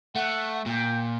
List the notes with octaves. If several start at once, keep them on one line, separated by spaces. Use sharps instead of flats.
A3 F#5
A#2 G5